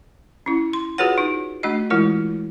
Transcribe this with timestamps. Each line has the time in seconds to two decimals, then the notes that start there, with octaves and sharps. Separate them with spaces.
0.46 C#4 E4
0.73 C6
0.98 F4 F#4 G#4 B4 C#5 F#5
1.18 D#4
1.63 A3 D4 F#4 D#5
1.90 E3 G#3 E4 F4 A#4